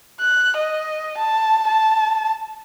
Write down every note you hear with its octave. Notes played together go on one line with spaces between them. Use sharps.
F#6
D#5
A5
A5